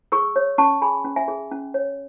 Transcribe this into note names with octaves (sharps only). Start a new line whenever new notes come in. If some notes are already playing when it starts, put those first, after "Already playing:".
G#4 C#6 E6
C#5
C#4 A5 C#6
G#4 G#5 B5
C#4
E5 G#5
G#4
C#4
C#5